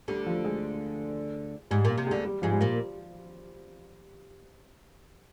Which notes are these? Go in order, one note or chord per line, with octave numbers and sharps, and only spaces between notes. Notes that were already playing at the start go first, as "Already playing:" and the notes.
D2 D3 G3
F3
G#3
G#2 G3
A#2 A#3
C3
D2 D3 G#3
G3
G#2 F3 G#3
G3
A#2 A#3